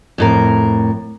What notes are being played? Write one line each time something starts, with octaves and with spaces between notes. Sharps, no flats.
F2 A2 A#4